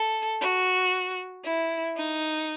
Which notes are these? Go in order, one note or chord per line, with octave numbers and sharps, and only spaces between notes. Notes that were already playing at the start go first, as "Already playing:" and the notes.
Already playing: A4
F#4
E4
D#4